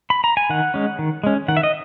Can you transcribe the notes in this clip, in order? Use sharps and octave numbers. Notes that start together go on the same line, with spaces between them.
B5
A#5
G#5
D#3 F#5
G#3 C#4
D#3
G#3 C#4
D#3 F#5
E5
D#5